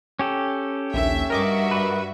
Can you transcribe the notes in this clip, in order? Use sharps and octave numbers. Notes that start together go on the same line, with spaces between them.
C#4 G4 A4
A#1 D#2 E5
G2 F#4 A#4 D#5 E5 D6
B4